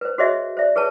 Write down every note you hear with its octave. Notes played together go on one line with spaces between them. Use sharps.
B4 C5
F#4 G#4 C5 C#5 D#5 E5
C5 D5 E5
G#4 B4 C#5 A5